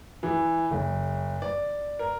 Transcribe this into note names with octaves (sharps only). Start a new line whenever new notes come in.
E3
F#1
D5
A#4